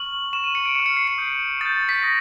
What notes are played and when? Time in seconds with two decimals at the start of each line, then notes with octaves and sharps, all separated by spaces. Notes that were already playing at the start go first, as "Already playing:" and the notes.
Already playing: C#6 F6 F#7
0.33 C#6 F6 E7
0.44 D#7
0.55 C#7
0.66 D7
0.75 C#6 F6 C#7
0.86 C#7
0.97 C7
1.08 C#7
1.18 D#6 G6
1.61 D#6 G6 A6
1.89 B6
2.03 D#6 A#6